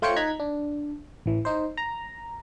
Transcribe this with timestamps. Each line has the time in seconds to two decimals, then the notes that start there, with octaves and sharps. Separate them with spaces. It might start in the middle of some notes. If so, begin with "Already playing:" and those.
0.02 A3 F4 C5 C#5 G5 C#7
0.16 D#4 A#5 F#6 G#6 B6
0.40 D4
1.26 A1 E3
1.45 D#4 C5
1.77 A#5